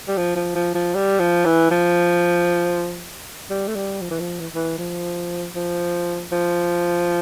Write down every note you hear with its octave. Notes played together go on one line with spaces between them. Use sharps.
G3
F3
F3
F3
F3
G3
F3
E3
F3
G3
A3
G3
F3
E3
F3
E3
E3
F3
F3
F3